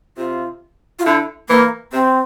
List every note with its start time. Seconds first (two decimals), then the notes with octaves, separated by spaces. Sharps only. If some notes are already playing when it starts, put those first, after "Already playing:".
0.17 C3 F4
0.99 F4
1.06 D3 E4
1.49 E3 A#3
1.93 C3 C4